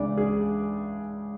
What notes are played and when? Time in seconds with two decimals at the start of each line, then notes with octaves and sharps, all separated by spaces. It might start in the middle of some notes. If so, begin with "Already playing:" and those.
Already playing: C#2 C#3 E3 D4 D5
0.18 G#4